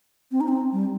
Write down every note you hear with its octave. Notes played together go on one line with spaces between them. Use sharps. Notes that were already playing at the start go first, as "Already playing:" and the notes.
C4
D#4
C4
G3